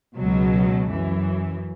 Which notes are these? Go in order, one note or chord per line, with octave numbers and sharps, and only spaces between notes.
C#2 B2 F#3
F#2 E3